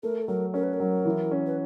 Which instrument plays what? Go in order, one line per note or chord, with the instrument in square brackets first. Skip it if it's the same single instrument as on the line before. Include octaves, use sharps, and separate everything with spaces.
[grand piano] A3 [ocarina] A#4
[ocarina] A4
[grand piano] F#3 [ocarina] A#4
[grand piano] C#4 [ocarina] A#4
[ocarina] B4
A#4
[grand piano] F#3
E3
C#4
[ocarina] B4